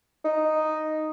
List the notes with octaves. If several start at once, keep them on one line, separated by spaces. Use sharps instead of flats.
D#4